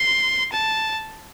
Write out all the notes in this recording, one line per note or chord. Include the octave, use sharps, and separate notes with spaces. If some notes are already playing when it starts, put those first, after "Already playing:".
Already playing: C6
A5